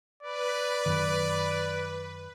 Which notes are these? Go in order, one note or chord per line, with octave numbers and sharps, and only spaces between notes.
B4 D5
F#2 D#3